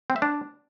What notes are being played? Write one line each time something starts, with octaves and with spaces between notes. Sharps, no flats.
C4
E5
D4